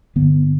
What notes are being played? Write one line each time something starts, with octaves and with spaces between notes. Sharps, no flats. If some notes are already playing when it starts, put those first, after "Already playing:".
G2 D3 B3